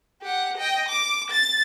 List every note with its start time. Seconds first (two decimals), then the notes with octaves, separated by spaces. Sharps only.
0.22 G4 F#5
0.58 D#5 G5
0.89 D6
1.30 A6